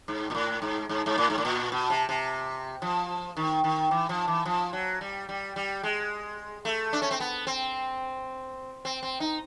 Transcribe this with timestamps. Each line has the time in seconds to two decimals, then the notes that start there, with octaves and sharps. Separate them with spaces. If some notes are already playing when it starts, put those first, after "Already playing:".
0.08 G#2
0.30 A#2
0.35 A2
0.62 G#2
0.89 G#2
1.06 G#2
1.18 A2
1.30 G#2
1.38 A2
1.45 A#2
1.72 B2
1.90 C3
2.09 C3
2.82 F3
3.37 D#3
3.64 D#3
3.91 E3
4.09 F3
4.28 E3
4.45 F3
4.73 F#3
5.01 G3
5.29 G3
5.56 G3
5.83 G#3
6.65 A3
6.93 D4
7.02 C#4
7.11 C4
7.20 B3
7.47 C4
8.85 C4
9.03 C4
9.20 D#4